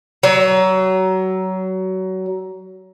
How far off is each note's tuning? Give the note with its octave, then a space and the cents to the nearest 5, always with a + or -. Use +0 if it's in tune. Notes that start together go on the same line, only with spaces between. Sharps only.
F#3 +25